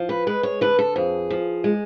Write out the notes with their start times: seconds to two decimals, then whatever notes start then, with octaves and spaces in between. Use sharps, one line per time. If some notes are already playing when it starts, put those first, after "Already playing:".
Already playing: F3
0.09 B4
0.27 G#3 B4
0.43 C#5
0.61 D3 B4
0.79 A4
0.96 F2 G#4
1.30 F3
1.64 G#3